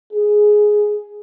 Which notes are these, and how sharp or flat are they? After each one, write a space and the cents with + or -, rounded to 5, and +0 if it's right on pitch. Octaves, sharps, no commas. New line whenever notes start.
G#4 +5